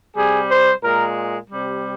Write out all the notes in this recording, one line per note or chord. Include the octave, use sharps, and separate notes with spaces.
C3 G3 G#4
C5
A#2 G#3 A#4
C3 G3